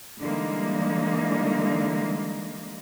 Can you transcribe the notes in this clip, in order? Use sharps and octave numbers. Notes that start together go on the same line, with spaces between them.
D3 E3 G3 G#3 A#3 D#4